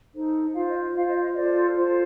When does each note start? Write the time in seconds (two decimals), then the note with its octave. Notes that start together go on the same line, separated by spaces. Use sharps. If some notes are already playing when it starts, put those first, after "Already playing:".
0.13 D#4 A4 C5
0.54 F4 C5 F5
0.67 D#5
0.94 F4 C5 F5
1.08 D#5
1.21 D#5
1.35 F4 A4 C5 D5
1.76 F4 A4 C5